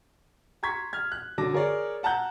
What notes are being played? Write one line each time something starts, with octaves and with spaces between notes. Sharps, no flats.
A#5 C6 C#6 G#6 B6
F6 G#6
F#6
D3 F#3 A5 D6 A#6
G#4 A#4 C#5 D5
F#5 A5 A#5 F#6 G6